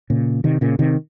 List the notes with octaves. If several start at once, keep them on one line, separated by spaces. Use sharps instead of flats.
A#2 C#3
C3 D#3
A#2 C#3
C3 D#3